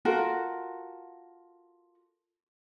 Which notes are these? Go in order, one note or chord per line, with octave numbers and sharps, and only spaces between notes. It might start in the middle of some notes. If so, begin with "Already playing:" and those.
F4 F#4 A4 A#4